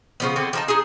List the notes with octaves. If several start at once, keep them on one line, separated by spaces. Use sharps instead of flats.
C#3 F3 B3
D3 B3 C4
F3 D#4 A5
D#4 G#4